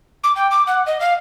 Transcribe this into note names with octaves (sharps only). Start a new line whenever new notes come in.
D6
G5
D6
F#5
D#5
F5